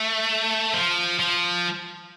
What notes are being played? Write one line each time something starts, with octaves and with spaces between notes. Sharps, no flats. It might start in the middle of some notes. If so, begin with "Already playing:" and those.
Already playing: A3
F3
F3